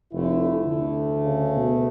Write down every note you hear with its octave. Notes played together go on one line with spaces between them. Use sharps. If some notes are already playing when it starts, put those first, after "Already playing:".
F1 D3 A3 E4
D2 D3 A3
C#3
B2